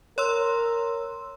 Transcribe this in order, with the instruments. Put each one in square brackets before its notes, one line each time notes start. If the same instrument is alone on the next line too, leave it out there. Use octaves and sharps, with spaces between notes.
[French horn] A#4 [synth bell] C#5 C6 E6